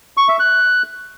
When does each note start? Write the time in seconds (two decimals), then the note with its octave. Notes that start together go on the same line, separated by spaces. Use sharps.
0.17 C#6
0.28 E5
0.39 F#6